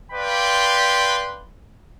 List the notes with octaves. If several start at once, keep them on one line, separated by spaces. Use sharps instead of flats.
B4 D5 F5 G5 B5 C6